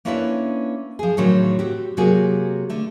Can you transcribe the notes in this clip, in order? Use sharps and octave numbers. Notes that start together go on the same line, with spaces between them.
A#3 C#4 D4 E4 F4 B4
F3 G#4
A2 D3 D#3 F#3 C#4 C5
C4 F#4 G4
C3 F#3 A#3 F#4 G#4
D3 A3